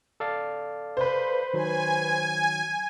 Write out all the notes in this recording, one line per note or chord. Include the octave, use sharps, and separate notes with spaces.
A4 D5 F5
B4 C5
D#3 F#3 G#5